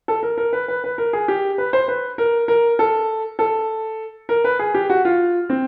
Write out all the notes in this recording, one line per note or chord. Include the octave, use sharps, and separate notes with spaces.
A4
A#4
A#4
B4
B4
B4
A#4
G#4
G4
B4
C5
B4
A#4
A#4
A4
A4
A#4
B4
G#4
G4
F#4
F4
C4